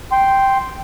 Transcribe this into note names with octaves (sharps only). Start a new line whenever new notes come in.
G5 C6